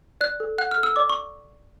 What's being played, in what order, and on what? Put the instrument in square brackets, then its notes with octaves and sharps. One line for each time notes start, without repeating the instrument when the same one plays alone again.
[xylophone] D5 F#6
A4
F#5 F#6
F6
A4
E6
D5 D6
C#6